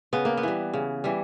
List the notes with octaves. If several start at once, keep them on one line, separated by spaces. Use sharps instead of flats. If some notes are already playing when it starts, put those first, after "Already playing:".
C#3 B3
A#3
B3
E3 G3
C#3
E3 G3